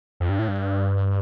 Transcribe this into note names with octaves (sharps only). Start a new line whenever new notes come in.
F2
G2
A2
G2